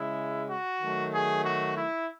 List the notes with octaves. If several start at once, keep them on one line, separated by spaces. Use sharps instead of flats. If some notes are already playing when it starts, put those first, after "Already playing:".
Already playing: C#3 G#3 E4
F#4
D#3 F#3 A3
G#4
F#4
E4